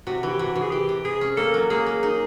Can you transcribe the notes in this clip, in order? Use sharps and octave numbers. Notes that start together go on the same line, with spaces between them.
C3 F#4
E3
G4
C3 F#4
E3
G#4
E3 G4
C3
C3 G#4
C#4
A#3 A4
F#3
A#3 G#4
A#3
D#4 G#4